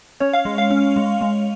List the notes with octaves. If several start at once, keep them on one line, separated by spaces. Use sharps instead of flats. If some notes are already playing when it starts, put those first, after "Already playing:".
C#4 C#5
F5
G#3
F5
C#4
G#3
G#3